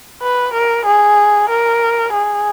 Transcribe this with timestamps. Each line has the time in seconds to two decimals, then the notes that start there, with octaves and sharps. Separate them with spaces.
0.22 B4
0.54 A#4
0.86 G#4
1.50 A#4
2.13 G#4